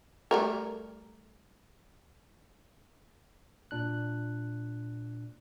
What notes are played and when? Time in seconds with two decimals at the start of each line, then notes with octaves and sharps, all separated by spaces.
0.31 G3 A3 A#4
3.71 A#2 D4 F#6